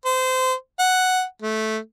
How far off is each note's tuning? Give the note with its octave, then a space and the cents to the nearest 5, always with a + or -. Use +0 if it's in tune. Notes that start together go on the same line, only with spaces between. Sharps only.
C5 -25
F#5 +0
A3 -10